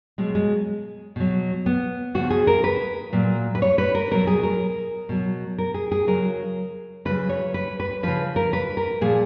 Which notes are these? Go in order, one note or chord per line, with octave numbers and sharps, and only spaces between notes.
B2 F#3 G#3
G#3
B2 F#3
B3
C#3 F3 F#4
G#4
A#4
B4
A#2 F#3
B4
C#5
B4
A#4
B2 F#3 A#4
G#4
A#4
B2 F#3
A#4
G#4
G#4
C#3 F#3 A#4
C#3 F#3 B4
C#5
B4
B4
C#3 F3 B4
A#4
B4
A#4
A#2 F3 G#4